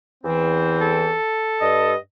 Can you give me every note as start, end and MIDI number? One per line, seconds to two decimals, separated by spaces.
0.24 1.14 40
0.24 1.14 52
0.24 1.14 60
0.81 1.93 69
1.61 1.96 43
1.61 1.96 75